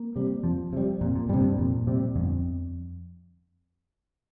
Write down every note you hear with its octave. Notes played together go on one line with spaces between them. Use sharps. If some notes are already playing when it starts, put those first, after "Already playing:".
Already playing: A#3
C3 G3
F2 F3
C3 G3
F2 A#2
A#2
G2 C3 G3
G2
F2 A#2
C3 G3
G1 F2